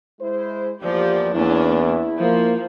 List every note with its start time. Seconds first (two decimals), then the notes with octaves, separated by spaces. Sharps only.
0.20 G#3 E4 C5
0.83 E2 F3 A#3 G4 D5
1.35 E2 A#3 C#4 D4 E4
2.19 F3 A#3